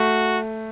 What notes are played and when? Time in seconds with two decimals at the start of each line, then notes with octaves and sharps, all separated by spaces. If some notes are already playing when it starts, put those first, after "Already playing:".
Already playing: A3 F#4